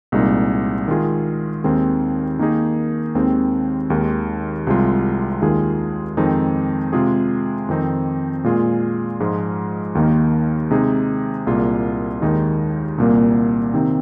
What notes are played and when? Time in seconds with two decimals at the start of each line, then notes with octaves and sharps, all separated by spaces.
0.12 C2 A#2 G#3 D#4
0.88 D#3 G#3 F4 G#4
1.64 D#2 D#3 G#3 C4 G#4
2.39 D#3 A#3 D#4 G#4
3.15 D#2 D#3 G#3 C4
3.90 D#2 D#3 G#3
4.67 C2 C3 G#3 F4
5.42 D#2 D#3 G#3 F4 G#4
6.17 F2 D#3 G#3 C4 D#4
6.93 C3 G#3 F4 G#4
7.68 F2 D#3 C4 D#4
8.44 A#2 G#3 F4 G#4
9.20 G#2 F3 G#3 F4 G#4
9.95 D#2 D#3 A#3 D#4
10.71 C3 G#3 D#4 G#4
11.47 C2 A#2 A#3 F4 G#4
12.22 D#2 D#3 G#3 D#4
12.98 C2 A#2 A#3
13.74 C3 D#3 C4 D#4